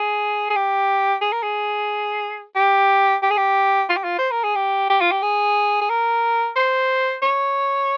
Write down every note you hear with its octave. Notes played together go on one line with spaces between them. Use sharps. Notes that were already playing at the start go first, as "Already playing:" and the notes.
Already playing: G#4
G#4
G4
G#4
A#4
G#4
G4
G4
G#4
G4
F4
G4
F4
C5
A#4
G#4
G4
G4
F4
G4
G#4
G#4
A#4
C5
C#5